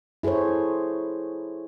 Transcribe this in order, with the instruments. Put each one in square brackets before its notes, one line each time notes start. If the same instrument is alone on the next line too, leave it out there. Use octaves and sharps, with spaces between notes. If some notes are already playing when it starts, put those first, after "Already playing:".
[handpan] E4 G#4 A4 C5 C#5